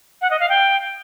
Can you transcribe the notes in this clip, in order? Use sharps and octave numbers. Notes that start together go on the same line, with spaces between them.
F#5
D#5
F5
G5